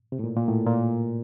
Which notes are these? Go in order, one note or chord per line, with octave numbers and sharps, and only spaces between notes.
C3
A2
A#2
A#2
A2
A#2